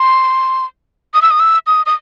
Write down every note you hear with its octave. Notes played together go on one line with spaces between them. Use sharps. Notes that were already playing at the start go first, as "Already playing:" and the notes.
Already playing: C6
D#6
E6
D#6
E6
D#6
D#6